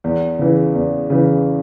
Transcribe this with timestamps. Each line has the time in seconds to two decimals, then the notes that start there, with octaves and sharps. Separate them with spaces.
0.04 E2
0.39 C#3 E3
0.75 E2
1.10 C#3 E3